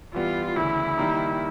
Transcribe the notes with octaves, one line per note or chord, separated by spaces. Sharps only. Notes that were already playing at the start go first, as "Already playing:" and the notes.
E3 G3 B3 F4
D2 C#3 E3 E4
D#3 G3 A#3 D#4